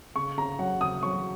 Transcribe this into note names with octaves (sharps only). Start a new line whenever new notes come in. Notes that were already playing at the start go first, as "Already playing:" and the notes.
C#3 C#6
C#3 A#5
F#3 F#5
C#3 D#6
F#3 C#6